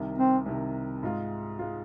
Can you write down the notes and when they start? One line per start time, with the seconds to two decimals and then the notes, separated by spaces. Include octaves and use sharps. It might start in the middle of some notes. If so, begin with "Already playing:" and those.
Already playing: C2 C3 D#3
0.18 C4
0.46 C2 C3 D#3
1.03 G#2 G#3 F4
1.59 G#3 F4